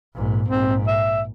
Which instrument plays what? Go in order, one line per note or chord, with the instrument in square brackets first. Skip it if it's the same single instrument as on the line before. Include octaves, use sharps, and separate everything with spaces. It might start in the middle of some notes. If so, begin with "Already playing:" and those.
[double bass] A#1 G#2
[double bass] A#1 G#2 [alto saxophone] C4
[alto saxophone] E5